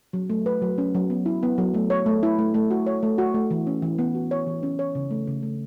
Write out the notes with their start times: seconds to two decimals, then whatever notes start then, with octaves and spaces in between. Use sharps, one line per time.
0.13 F#3
0.30 A3
0.46 B4
0.62 F#3
0.78 C#4
0.95 F#3
1.10 B3
1.26 E4
1.43 B3
1.58 F#3
1.74 A3
1.90 C#5
2.06 A3
2.23 E4
2.38 A3
2.54 A3
2.71 F#4
2.87 C#5
3.03 A3
3.18 F#4
3.34 A3
3.51 E3
3.67 C#4
3.82 E3
3.99 B3
4.15 F#4
4.31 C#5
4.47 E3
4.63 C#4
4.79 C#5
4.95 C#3
5.11 A3
5.27 C#3
5.43 A3